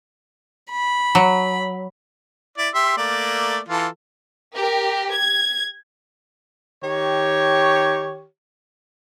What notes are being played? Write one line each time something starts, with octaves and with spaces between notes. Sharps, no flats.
B5
F#3
E4 D5
G4 E5 C6
A3 A#3 D5
E3 F4 A4
G4 A#4
G#6
D#3 G4 C#5